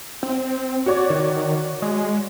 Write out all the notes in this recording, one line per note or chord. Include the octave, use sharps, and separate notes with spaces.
C4
F#4 C#5 D5
D#3
G#3